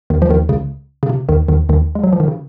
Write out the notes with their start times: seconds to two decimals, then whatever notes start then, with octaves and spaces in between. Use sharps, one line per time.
0.10 D#2 D#3
0.22 F3
0.29 D#2 D#3
0.49 C#2 C#3
1.03 C#3
1.09 C3
1.29 D#2 D#3
1.48 D#2 D#3
1.69 D#2 D#3
1.95 G#3
2.03 F#3
2.13 F3
2.20 D#3
2.28 C#3